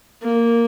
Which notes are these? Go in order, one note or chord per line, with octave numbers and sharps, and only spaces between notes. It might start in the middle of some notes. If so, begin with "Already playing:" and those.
A#3